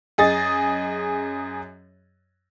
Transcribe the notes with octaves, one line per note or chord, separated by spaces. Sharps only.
F#2 G#4 D#5 A6